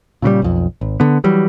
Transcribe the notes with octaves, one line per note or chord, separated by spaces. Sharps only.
A#2 C#3 E3 G3
B1 F2
G#1
D3 B3
E3 F#3 G3